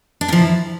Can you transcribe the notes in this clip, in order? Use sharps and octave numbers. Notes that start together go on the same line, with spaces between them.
D4
A#2 F3 E4